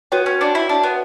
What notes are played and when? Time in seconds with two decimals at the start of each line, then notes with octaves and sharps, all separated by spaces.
0.12 B3 F#4 C#5 G5
0.26 C#4
0.41 D4
0.55 E4
0.69 D4
0.83 B3